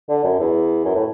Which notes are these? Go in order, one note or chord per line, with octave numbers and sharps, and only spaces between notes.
D3
F#2
E2
F#2
A2